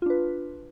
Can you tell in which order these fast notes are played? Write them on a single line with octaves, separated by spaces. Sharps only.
F4 D4 B4